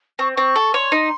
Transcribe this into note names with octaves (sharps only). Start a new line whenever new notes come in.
C4 C#6
C4 C#6
A4
C#5 C6
D#4